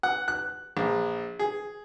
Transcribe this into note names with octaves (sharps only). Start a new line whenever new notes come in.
F#5
F#6
A#1
G#4